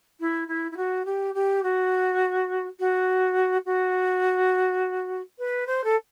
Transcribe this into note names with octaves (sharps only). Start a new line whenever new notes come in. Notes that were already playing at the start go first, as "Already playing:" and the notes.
E4
E4
E4
F#4
G4
G4
F#4
F#4
F#4
B4
C5
A4